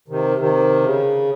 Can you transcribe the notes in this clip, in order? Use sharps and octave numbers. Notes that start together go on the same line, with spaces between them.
C3 D#3
C3 D#3
C#3